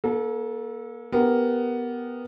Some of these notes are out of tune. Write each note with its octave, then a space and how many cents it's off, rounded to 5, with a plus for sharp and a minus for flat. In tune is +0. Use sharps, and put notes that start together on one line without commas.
A#3 +35 A4 -15
B3 +0 G4 +0 A#4 +0